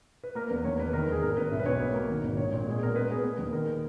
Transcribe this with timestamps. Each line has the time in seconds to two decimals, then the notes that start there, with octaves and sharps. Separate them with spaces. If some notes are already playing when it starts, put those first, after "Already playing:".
0.24 B4
0.35 A#3 A#4
0.50 E2 B4
0.64 D#2 C#5
0.78 A#3 B4
0.93 D#3 A#4
1.08 D#2 G#4
1.22 G#1 A#4
1.37 G#1 B4
1.52 B1 E5
1.60 B4
1.66 B1 C#5
1.80 A#3
1.95 A#3
2.09 D#3
2.24 G#1
2.37 A#1 C#5
2.52 A#2
2.67 G#3 G#4
2.82 B2 A#4
2.96 B3 B4
3.10 B3 G#4
3.24 B3
3.38 D#2
3.53 D#3 A#4